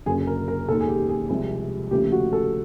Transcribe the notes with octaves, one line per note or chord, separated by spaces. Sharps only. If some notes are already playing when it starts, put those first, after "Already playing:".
F#1 F#2 D3 G#4
A#4
A#4
E1 D#2 D#3 A4
G#4
G4
G#4
C2 C3 F3 G#3
D#2 C#3 F3 A3 G4
F#4
A4